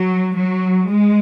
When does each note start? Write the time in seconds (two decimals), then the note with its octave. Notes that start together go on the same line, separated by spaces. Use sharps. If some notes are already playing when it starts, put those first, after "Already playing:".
Already playing: F#3
0.37 F#3
0.89 G#3